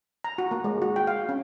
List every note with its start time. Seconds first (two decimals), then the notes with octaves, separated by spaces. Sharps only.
0.24 A#5
0.38 F#4
0.51 A#3
0.64 G#3
0.82 F#4
0.96 G5
1.07 F5
1.29 C#4